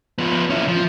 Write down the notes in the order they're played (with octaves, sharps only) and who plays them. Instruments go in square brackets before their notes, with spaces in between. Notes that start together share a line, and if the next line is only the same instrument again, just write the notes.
[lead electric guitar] F3 B3
C#4 E4
F3